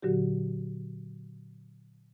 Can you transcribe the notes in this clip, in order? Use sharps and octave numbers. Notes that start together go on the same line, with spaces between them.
A#2 D3 F#3 F#4 G4